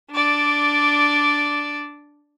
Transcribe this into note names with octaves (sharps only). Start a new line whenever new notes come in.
D4 D5